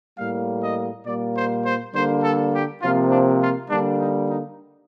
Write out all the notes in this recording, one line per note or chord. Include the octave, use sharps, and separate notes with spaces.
A2 G3 A#3 F5
D#5
A#2 G3 A#3 D5
C5
C5
D3 G3 A#3 C5
A4
G4
C3 F3 A#3 F4
D4
F4
D3 G3 A#3 D4
D#4
D#4